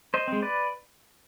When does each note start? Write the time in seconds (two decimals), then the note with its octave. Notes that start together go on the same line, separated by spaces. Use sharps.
0.14 C5 D#5
0.28 G#3 C4
0.42 B4 D5